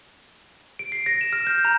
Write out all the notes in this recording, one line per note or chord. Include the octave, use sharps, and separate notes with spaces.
D7
C7
A#6
E7
F6
G6
A#5